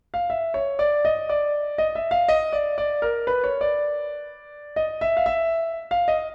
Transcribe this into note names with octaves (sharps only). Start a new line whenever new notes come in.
F5
E5
C#5
D5
D#5
D5
D#5
E5
F5
D#5
D5
D5
A#4
B4
C#5
D5
D#5
E5
F5
E5
F5
D#5